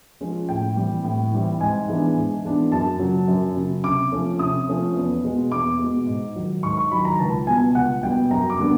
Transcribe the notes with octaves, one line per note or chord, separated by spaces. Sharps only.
F3 G#3 C#4
A2 G5
E3 G3 C4
A2
E3 G3 C4
G#2 G#5
E3 G#3 B3 D4
G#2
E3 G#3 B3 D4
F#2 A5
C#3 F#3
F#2
C#3 F#3
C3 D6
F3 A3 C#4
C3 D#6
F3 A3 C#4
E2
B2 G#3
E2 D6
B2 G#3
G#2
D#3 F#3
G#2 C#6
C#6
D#3 F#3 B5
A#5
C#2 A5
B2 G3 B3 G#5
C#2 F#5
B2 G3 B3 G5
F#2 A#5
D6
D3 G3 B3 D4